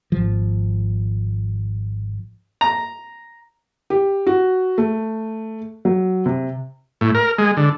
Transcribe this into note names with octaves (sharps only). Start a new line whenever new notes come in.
G#1 F3
A#5
G4
F#4
A3
F#3
C3
A2
A#4
G#3
D3